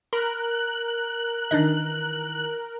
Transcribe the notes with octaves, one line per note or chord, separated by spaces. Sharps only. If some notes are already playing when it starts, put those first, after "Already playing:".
A#4 B5 F#6
D#3 E3 D4 D#4 D#5